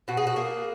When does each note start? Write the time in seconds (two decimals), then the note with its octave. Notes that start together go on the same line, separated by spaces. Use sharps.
0.08 B2 F#4
0.17 G#4
0.27 F#4
0.36 A#3 G#4